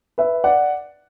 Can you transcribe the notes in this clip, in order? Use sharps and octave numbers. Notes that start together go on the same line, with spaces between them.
B4 E5
D5 F#5